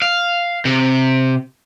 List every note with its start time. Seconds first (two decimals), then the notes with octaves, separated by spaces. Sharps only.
0.02 F5
0.65 C3